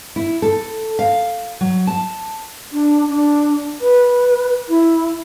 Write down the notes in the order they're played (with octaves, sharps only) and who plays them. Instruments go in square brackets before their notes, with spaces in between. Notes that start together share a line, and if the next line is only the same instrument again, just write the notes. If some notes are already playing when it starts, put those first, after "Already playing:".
[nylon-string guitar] E4
A4
F5
F#3
A5
[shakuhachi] D4
D4
B4
E4